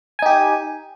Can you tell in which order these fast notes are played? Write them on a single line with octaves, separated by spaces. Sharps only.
G#5 D#4 G4